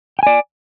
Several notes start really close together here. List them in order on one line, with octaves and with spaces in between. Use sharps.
G5 G#5 D5